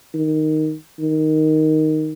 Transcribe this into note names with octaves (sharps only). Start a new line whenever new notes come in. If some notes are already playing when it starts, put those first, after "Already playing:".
D#3
D#3